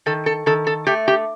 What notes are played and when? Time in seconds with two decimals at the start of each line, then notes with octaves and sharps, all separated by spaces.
0.06 D#3 A4
0.26 A4
0.46 D#3 A4
0.67 A4
0.87 A3 G4
1.08 G4